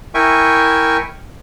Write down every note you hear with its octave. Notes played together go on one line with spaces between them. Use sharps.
E4 A#4 E5 G5 G#5 C#6